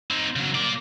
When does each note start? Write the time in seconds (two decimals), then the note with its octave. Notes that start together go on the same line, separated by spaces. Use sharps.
0.11 C4 D#4
0.36 C#3 F#3
0.55 A#3 D5